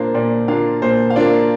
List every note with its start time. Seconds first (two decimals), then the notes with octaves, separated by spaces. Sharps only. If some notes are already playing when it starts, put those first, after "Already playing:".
Already playing: A#2 A#3 D4 F4 C5
0.14 A#2 D5
0.48 A#3 D4 F4 F5
0.82 A#2 C5
1.10 F5
1.16 A#3 D4 F4 D5